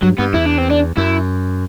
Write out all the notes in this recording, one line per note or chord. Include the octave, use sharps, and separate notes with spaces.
G2 F#3
G2 B3
E2 E4
D4
C4
D4
F#2 E4